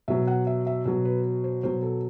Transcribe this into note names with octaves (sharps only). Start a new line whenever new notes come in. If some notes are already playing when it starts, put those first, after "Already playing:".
B2 F#3 E5
F#5
E5
E5
B2 F#3
B4
C5
B2 F#3 C5
A4